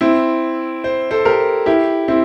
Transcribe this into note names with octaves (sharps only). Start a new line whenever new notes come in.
C4 E4
C5
A4 C5
G4 A#4
E4 G4
C4 E4